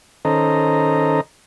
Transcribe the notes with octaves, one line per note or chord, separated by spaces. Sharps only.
D#3 C#4 A4 C5 D#5 A#5